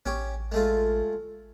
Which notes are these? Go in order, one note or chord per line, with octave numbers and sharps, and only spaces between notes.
A1 C#4 G4 C#5
G#3 A3 F4